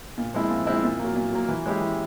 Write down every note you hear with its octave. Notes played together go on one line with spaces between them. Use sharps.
A#2
F3 G#3 C4 E4
A#2
F3 G#3 C4 E4
A#2
A#3
F#3
A#2
F#3 A#3
E3
G#3 C#4 E4 G4
E3